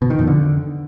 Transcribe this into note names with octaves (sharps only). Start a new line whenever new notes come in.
B2
D#3
F2
D3